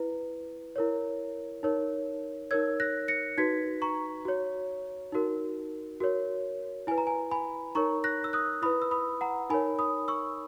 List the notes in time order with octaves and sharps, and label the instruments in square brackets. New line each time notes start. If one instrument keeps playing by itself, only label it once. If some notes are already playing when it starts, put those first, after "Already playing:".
Already playing: [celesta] E4 B4
E4 A#4 C#5
D#4 A#4 C#5
D#4 A#4 C#5 E6 G#6
F#6 A#6
A#6 C#7
D#4 F#4 B4 G#6 B6
A#5 C#6
F#4 C#5
D#4 F#4 A#4
F#4 A#4 C#5
E4 B4 G#5
A#5
G#5
G#5 B5
D#4 A#4 C#5 A#5 C#6
F#6 A#6
E6
D#6 F#6
E4 B4 B5 D#6
E6
B5 D#6
F#5 A#5
D#4 A#4 C#5 G#5 B5
B5 D#6
C#6 E6